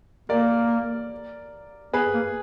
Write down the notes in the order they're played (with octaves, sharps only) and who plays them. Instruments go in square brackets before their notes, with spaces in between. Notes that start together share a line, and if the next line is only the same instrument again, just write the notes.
[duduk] A#3 [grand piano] A#4 D5
[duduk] B3 [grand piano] G#4 B4
[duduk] A#3